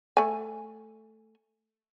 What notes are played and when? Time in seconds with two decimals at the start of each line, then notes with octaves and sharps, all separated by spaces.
0.17 A3 G#5